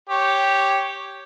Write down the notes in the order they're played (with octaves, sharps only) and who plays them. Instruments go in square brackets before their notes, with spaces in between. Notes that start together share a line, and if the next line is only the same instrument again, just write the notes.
[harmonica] G4 C#5